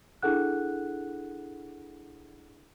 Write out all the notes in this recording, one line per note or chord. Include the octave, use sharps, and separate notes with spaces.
D4 E4 G#4 A4 F#5 F#6